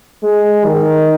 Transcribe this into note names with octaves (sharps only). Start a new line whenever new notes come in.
G#3
D#3